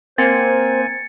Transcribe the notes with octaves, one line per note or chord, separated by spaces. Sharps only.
A#3 C4 C5 G#5 A6 C#7